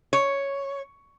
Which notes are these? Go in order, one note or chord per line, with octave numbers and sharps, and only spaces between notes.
C#5